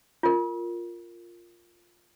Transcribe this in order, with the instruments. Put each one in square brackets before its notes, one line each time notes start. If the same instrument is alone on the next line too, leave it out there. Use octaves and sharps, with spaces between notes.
[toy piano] F4 A#4